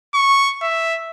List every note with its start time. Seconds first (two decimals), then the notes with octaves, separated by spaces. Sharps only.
0.14 C#6
0.62 E5